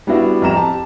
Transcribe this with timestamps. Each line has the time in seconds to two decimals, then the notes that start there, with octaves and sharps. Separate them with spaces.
0.07 G3 B3 D4 E4 F#4
0.42 F2 G4 A#5 E7
0.56 G4 A5